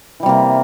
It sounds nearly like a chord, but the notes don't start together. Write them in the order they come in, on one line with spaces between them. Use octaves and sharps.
E3 G3 C3 A#3